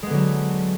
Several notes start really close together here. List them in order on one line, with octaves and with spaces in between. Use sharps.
G#3 B3 D3 F#3